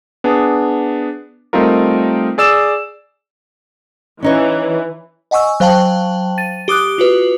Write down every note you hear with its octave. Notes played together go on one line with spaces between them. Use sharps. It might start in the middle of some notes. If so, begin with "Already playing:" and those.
B3 D4 G#4
G3 A3 C4 D#4 F4 A#4
G#4 D5 E6 E7
E3 C#4 D#4 C#5
D#5 F#5 G#5 C#6 E6
F#3 C5 F5 G5 A5 F#7
A6 D#7
G4 D6 D#6 F#6
F4 F#4 B4